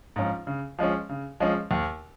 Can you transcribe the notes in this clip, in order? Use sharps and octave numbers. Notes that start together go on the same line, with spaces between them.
G#2 F3 C#4 F4
C#3
F3 G#3 C#4
C#3
F3 G#3 C#4
D#2